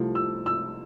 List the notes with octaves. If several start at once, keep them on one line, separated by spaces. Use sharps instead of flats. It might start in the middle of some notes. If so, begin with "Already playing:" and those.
Already playing: C2 C3 F3 A3
E6
E6